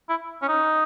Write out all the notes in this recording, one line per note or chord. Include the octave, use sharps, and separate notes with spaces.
E4
C#4
D#4